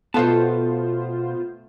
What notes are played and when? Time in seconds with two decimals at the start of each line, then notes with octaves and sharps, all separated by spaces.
0.14 B2 A3 B3 F4 B4 C5 A5